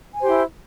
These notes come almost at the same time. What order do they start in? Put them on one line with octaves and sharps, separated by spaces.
G#5 C5 G4 E4